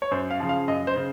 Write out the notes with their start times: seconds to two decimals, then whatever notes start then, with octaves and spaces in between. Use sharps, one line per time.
0.02 C#5
0.11 F#2 C5
0.30 F5
0.40 C#3 F3
0.49 F5
0.68 F#2 D#5
0.87 C5
0.96 C#3